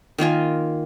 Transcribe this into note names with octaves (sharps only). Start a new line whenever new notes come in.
D#3 A#3 F4 G#5